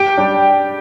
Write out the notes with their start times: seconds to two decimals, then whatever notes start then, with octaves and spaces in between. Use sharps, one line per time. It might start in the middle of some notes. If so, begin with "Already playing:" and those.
Already playing: G4 G5
0.17 G3 D4